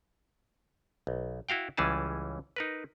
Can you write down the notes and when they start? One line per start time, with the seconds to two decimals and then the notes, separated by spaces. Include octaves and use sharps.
1.07 B1
1.49 E4 F#4 F5 G5
1.77 C#2 E3 G3 C#4 G#4 A5
2.56 D#4 A#4 B4